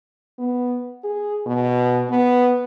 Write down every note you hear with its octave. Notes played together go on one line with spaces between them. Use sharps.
B3
G#4
B2
B3